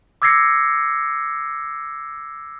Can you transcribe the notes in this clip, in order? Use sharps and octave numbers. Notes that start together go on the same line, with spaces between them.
D6 E6 G#6 A#6 C7 C#7